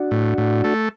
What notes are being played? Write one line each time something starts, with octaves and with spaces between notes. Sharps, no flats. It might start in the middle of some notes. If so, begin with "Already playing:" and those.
Already playing: D4 F#4
A2
A2
A3